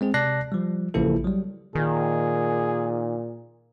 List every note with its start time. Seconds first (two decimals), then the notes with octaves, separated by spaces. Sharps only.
0.01 G#3 C4 G#4
0.14 C3 D5 A5 F#6 A#6 C7
0.52 F3 G3
0.94 A1 C#3 F3 A#3 E4 A4
1.24 F#3 G3
1.75 A#2 D#3 G#4